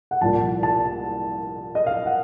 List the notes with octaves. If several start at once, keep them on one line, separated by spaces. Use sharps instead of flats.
F#5
C2 A#2 F3 A5
A5
D#5
F5
F#5